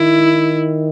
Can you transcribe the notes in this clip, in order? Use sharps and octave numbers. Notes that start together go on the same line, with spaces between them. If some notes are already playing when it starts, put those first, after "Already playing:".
Already playing: D#3 E4